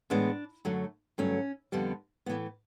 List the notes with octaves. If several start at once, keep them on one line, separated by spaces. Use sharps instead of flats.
A2 E3 G#3 B3 D4
F#2 D3 F#3 A3
G2 D3 F#3 A3 C#4
F2 D3 G3 B3
A2 E3 A3 B3